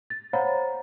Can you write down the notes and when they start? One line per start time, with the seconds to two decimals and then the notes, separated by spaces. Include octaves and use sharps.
0.10 A6
0.33 C5 C#5 F5 F#5 A#5 B5